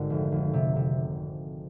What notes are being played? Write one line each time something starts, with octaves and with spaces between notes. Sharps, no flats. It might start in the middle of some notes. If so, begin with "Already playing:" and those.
Already playing: G#1 D3
F1
F1
C3
C3